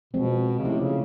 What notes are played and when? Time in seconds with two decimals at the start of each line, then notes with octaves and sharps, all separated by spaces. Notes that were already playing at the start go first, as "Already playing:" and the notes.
0.13 B2 F3 G#3 C4
0.59 C#3
0.64 C3 F3 A3 C#4 E4
0.80 C#3